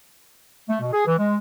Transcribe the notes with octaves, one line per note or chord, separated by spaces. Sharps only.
A3
B2
G#4
E3
G#3